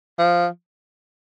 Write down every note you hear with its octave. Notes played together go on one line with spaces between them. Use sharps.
F3